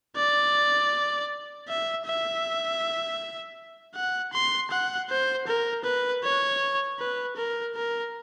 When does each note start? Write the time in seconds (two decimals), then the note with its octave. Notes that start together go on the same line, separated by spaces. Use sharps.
0.17 D5
1.68 E5
2.06 E5
3.95 F#5
4.33 C6
4.71 F#5
5.09 C5
5.47 A#4
5.84 B4
6.24 C#5
6.99 B4
7.37 A#4
7.75 A#4